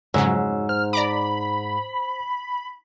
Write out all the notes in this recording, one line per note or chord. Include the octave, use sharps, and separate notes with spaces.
F2 G#2 C#3 F#3 C#5 E6
C5 F6
D5 A#5 B5 D6